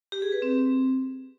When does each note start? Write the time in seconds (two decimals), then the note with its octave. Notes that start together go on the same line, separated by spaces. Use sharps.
0.12 G4
0.22 G#4
0.32 B4
0.42 C4